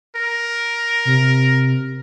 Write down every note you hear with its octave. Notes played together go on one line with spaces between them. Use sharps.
A#4
C3